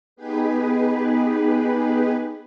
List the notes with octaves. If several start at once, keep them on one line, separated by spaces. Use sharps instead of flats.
B3 D#4 G4 G#4 B4